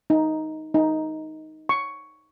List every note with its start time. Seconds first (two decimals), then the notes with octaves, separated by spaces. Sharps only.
0.10 D#4
0.74 D#4
1.69 C#6